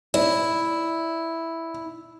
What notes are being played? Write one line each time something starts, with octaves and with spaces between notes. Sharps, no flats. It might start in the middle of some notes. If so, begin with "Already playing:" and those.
E4 D5